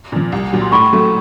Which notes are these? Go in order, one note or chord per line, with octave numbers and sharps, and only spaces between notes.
A#2 F3
C2
A#2 F#3
C6
A2 B5 C#6
F#3 A3